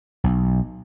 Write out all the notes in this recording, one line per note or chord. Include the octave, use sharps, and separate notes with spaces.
B1